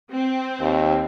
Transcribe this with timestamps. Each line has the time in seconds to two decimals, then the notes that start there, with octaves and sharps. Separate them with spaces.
0.12 C4
0.61 D#2